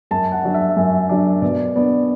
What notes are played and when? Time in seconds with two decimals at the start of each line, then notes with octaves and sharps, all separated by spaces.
0.11 F#2 A5
0.32 F#5
0.43 F#3 D4
0.54 E5
0.76 F#2
1.09 F#3 D4
1.42 B2 D5
1.76 B3 D4 D5